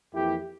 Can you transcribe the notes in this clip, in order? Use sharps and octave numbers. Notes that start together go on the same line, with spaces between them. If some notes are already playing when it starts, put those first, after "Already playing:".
F2 E3 A#3 E4 G4